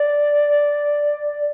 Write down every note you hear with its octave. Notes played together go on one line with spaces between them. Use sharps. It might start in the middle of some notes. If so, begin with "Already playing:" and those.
Already playing: D5